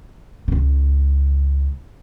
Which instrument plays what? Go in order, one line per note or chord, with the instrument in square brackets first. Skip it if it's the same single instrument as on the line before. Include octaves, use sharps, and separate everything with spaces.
[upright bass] C#2 C#3